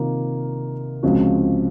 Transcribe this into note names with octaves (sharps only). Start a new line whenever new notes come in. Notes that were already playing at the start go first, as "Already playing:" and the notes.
Already playing: C3 D#3 A#3 F4
C#2 C#3 F3 C4 F#4